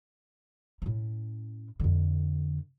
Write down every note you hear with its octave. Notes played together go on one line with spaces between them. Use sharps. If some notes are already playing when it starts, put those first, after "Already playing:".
A2 C#4
F2 D3